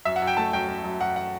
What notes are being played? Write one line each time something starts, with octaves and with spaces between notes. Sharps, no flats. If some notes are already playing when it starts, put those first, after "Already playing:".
F#2 E5
F#5
F#2
G5
A3 A5
F#2 G5
F#2
F#2
F#2 F#5
F#5